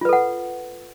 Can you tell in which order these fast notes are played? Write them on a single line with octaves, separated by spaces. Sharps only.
F4 B4 A4 F#5